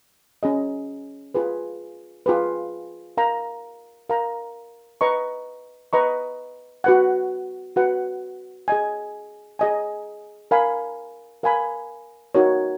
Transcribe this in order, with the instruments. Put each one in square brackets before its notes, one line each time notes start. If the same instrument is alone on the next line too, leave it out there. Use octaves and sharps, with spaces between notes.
[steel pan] C#4 G#4 D#5
F4 G#4 B4
F4 G#4 B4
A#4 F5 A#5
A#4 F5 A#5
B4 D#5 A#5 C#6
B4 D#5 A#5 C#6
F#4 B4 F#5
F#4 B4 F#5
G#4 D#5 G#5
G#4 D#5 G#5
A#4 F5 G#5 B5
A#4 F5 G#5 B5
D#4 F#4 A#4 C#5